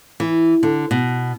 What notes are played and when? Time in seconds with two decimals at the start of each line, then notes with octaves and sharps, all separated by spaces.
0.20 E3
0.63 D3
0.91 B2